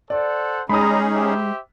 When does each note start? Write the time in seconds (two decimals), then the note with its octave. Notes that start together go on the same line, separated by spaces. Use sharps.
0.10 A4 C5 D5 F#5
0.69 G3 G#3 C#4 D#4 G#4 A#5 B5 D#6
1.14 G4 C5 E5